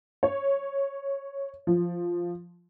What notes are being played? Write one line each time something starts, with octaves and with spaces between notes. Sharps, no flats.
C#5
F3